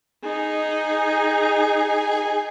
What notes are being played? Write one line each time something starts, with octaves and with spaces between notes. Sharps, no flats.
D#4 G#4